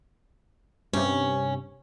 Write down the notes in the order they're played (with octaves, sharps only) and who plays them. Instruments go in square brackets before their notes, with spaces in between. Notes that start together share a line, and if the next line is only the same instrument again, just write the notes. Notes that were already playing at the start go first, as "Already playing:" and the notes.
[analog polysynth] G2 C3 [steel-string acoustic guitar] C#4